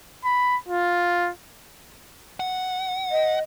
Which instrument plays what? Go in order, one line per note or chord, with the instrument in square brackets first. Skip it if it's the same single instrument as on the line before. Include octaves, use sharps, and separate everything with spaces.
[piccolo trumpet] B5
F4
[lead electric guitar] F#5
[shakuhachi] D#5